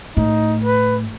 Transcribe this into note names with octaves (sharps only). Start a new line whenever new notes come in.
A2 D#4
B4